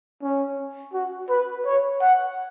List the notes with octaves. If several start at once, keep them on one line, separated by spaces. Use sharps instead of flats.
C#4
F#4
B4
C#5
F#5